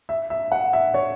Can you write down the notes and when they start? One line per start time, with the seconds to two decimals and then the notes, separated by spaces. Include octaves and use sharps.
0.09 E5
0.30 E5
0.52 F#5
0.73 E5
0.94 C#5